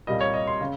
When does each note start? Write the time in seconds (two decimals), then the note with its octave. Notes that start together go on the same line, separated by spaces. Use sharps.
0.07 C2 A#2 G3 A#3 D#5
0.21 C#5
0.34 D#5
0.47 C6
0.61 C#3